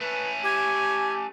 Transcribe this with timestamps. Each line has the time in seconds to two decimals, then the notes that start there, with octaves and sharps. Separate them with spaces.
0.01 A3 C#4 B4
0.44 G4 G#5